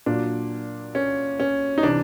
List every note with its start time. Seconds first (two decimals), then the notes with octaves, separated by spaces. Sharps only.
0.06 A#2 F#3 D4
0.95 C#4
1.40 C#4
1.78 D#4
1.83 C3 E3 D4